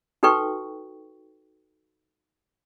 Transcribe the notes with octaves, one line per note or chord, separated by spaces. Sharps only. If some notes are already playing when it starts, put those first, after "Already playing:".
D#4 F#4 A4 B4 G5 C#6